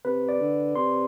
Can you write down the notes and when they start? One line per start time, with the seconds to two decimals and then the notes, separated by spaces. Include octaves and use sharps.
0.05 C3 B4
0.29 D5
0.40 D3
0.75 C3 C6